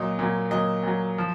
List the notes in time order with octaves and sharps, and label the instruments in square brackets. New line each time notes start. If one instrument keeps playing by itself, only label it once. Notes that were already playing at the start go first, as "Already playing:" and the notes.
Already playing: [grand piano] A#2 F#3 D#5
A#2 F#3
A#2 F#3 D#5
A#2 F#3
F3